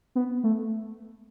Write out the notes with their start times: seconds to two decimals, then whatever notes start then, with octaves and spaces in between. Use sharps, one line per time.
0.15 B3
0.44 A3